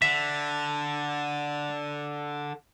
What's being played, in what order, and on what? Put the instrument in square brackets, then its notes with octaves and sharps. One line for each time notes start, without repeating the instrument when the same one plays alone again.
[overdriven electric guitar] D3 [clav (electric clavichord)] E5